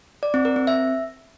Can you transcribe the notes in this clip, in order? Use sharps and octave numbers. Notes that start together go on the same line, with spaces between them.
D5
C4
A#4
C4
E5